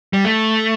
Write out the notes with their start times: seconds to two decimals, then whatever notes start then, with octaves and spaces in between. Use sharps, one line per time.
0.13 G3
0.25 A3